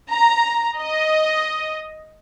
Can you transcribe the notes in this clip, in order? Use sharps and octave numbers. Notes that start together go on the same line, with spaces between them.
A#5
D#5